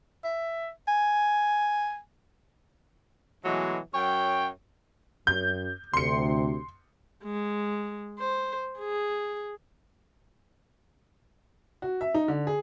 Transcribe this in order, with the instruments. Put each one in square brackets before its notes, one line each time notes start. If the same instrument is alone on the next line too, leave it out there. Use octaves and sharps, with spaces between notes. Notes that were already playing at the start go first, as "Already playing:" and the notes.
[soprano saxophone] E5
G#5
[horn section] B2 E3 F#3 G#3 A3
F#2 F#3 C#5 G5
[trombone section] F#2 [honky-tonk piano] G6
[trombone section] D2 C3 [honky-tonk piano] C6 C#7
[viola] G#3
C5
G#4
[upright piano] F#4
E5
D#4
D3
G#4